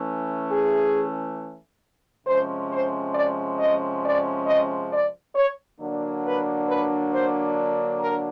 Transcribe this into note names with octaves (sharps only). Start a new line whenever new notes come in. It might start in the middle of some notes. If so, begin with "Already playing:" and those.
Already playing: E3 A3 C#4
G#4
C3 F3 G#3 C#4 C5
C5
D5
D#5
D5
D#5
D5
C#5
D3 F#3 A#3 D4
B4
B4
C5
A#4